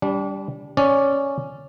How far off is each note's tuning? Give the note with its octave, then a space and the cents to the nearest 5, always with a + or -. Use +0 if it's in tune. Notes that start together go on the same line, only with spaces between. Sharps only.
G3 +0 D4 -35
C#4 +0 D5 +0